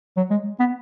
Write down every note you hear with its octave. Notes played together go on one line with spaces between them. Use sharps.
F#3
G#3
B3